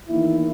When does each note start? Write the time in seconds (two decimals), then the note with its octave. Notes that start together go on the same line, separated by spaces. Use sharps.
0.09 E2 D#3 A#3 E4